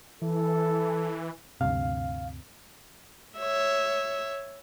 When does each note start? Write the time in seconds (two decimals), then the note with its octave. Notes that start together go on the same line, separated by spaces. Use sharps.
0.22 E3 A4
1.61 D2 G2 C3 F5
3.39 C#5 E5